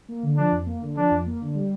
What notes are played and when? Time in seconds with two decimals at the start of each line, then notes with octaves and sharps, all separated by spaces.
0.09 A#3
0.23 D3
0.37 F3 D4
0.52 F2
0.66 A#3
0.81 D3
0.96 F3 D4
1.11 F2
1.26 A#3
1.41 D3
1.55 G3